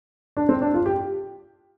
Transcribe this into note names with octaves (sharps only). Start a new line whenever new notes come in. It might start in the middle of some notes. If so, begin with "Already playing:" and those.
D4
C4
D4
F4
G4